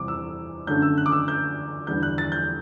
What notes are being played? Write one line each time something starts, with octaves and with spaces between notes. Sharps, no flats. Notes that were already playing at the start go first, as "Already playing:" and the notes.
Already playing: E2 C3 G3 D6
E6
F#2 D3 A3 G6
E6
F#6
D6
E6
G6
E2 D3 G3 G6
F#6
A6
G6